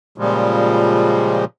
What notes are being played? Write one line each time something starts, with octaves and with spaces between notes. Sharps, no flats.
A#2 C#3 F3 G3 G#3